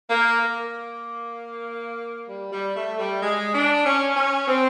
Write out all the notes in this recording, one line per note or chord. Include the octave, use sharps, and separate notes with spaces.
A#3
A#3
G3
G3
A3
G3
G#3
D4
C#4
C#4
C4